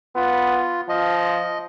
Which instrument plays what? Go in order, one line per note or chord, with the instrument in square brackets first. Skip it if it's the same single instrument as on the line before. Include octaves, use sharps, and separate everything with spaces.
[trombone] B3 [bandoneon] F4
[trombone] F3 [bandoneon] D#5